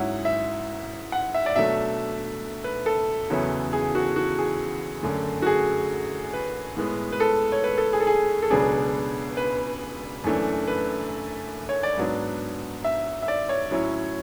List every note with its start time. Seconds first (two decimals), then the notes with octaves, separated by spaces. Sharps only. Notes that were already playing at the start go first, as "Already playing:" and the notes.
Already playing: G#2 F#3 C#4 E4 F#5
0.25 E5
1.12 F#5
1.34 E5
1.46 D5
1.56 B2 F#3 A3 D4 E5
2.64 B4
2.86 A4
3.30 E2 C#3 F#3 B3 E4
3.73 G#4
3.95 F#4
4.16 F#4
4.38 G#4
5.03 F#2 D3 A3
5.42 F#4
5.46 G#4
6.33 B4
6.77 A2 G#3 B3
7.12 B4
7.20 A4
7.52 C#5
7.64 B4
7.78 A4
7.93 G#4
8.01 A4
8.07 G#4
8.42 A4
8.50 C#2 B2 F#3 B3 D4 G#4
9.37 B4
10.24 F#2 E3 A3 D4
10.67 B4
11.69 C#5
11.83 D5
11.98 G#2 F#3 B3 D4
12.84 E5
13.22 E5
13.28 D5
13.49 C#5
13.71 A2 F#3 C#4 E4